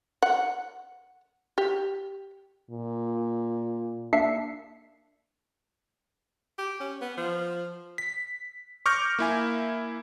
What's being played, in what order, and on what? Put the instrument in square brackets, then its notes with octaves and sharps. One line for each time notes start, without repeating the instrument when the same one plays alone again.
[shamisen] F#5
G4
[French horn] A#2
[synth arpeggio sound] A#3 D4 E5 C7 C#7
[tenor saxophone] G4
C#4
B3
F3
[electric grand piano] B6
C#6 D6 F6 G6 A#6
A#3 E4 G#5